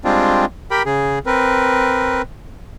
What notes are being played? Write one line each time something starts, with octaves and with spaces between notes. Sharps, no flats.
G3 G#3 C4 D4 F4
G4 A#4 G5 B5
C#3 G#4
C4 A#4 B4